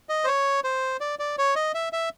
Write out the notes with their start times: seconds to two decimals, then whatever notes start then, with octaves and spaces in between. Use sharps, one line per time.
0.09 D#5
0.24 C5
0.27 C#5
0.64 C5
1.01 D5
1.19 D5
1.38 C#5
1.55 D#5
1.75 E5
1.93 E5